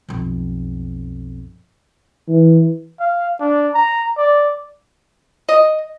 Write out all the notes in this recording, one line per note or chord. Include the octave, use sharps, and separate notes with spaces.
B1 F2
E3
F5
D4
A#5
D5
D#5